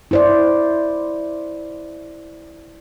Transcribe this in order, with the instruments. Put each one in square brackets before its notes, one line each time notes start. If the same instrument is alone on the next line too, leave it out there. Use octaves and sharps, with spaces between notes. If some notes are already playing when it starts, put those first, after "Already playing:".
[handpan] E4 C5 D5